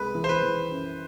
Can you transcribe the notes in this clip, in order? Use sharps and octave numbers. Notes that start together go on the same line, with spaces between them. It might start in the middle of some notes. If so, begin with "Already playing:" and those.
Already playing: C2 G#3 B4
E3
C5
B4
E3
F#2